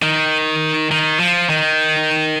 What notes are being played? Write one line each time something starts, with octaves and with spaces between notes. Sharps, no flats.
D#3
D#3
F3
D#3